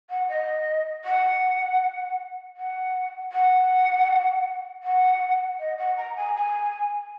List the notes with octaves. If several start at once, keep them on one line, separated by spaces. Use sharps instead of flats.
F#5
D#5
F#5
F#5
F#5
F#5
D#5
F#5
A#5
G#5
G#5